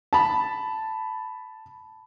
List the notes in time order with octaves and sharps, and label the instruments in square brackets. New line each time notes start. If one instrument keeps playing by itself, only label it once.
[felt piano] A5 B5